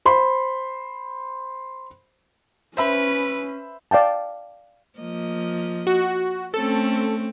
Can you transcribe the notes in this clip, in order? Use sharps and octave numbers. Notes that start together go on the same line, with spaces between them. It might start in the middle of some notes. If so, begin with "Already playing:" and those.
C5 B5 C6
C#4 B4 C5 E5 B5
D5 F5 G5 A5
F3 A#3 D#5
F#4
A3 C4 C#4 A4